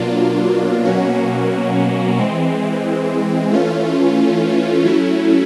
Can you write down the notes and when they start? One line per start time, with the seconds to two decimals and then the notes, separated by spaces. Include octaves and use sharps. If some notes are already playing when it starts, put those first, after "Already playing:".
Already playing: B2 F#3 A#3 D4 F4
0.85 B2 F#3 A#3 C#4 F#4
2.19 E3 G#3 C4
3.52 E3 A3 C#4 F4
4.85 F#3 A3 C#4 E4